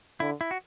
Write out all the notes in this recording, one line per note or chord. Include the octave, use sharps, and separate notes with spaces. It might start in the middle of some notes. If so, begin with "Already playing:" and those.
D3 E4
E4
F#4